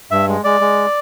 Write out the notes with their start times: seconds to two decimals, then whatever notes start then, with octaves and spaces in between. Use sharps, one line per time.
0.11 G2 E5
0.28 G#3
0.44 G#3 D5
0.61 G#3